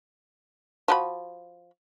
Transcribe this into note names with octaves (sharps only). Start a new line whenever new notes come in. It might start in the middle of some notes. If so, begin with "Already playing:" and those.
F3 F#4 B5